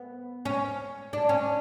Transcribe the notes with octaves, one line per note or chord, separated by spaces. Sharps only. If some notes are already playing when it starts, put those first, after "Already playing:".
Already playing: B3
C#4
D4
C#4